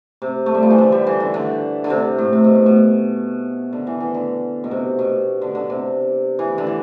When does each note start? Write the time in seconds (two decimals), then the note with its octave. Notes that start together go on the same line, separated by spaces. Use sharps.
0.22 C3
0.46 A3
0.55 G3
0.63 F3
0.70 E3
0.78 D3
0.92 G3
1.07 E3
1.20 D3
1.34 D3
1.84 D3
1.90 C3
2.18 A2
2.33 C3
2.44 B2
2.55 A2
2.66 B2
3.73 D3
3.87 E3
4.00 E3
4.14 D3
4.64 B2
4.71 C3
4.99 B2
5.42 D3
5.55 D3
5.70 C3
6.39 E3
6.58 D3
6.67 E3